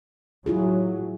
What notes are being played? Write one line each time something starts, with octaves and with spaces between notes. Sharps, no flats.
A2 F#3 E4 F4 G#4